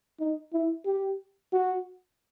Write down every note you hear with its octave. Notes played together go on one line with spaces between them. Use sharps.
D#4
E4
G4
F#4